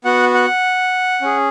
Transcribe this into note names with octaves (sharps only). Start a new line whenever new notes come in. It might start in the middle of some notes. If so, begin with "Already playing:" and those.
B3 F#4 F#5
F#5
C#4 G#4